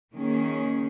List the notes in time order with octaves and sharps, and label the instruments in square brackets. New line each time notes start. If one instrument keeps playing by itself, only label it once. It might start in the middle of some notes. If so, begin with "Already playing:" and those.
[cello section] D#3 A#3 C#4 G#4